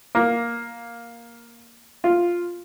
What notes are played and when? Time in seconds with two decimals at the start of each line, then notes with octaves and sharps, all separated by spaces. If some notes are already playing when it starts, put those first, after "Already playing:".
0.15 A#3
2.04 F4